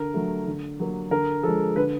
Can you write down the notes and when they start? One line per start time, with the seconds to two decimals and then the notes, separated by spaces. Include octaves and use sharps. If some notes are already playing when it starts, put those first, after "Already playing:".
Already playing: D3 A#4
0.14 F#3 A3
0.47 D3
0.80 F#3 A#3
1.11 D3 A#4
1.43 F3 G#3 A4
1.76 D3 B4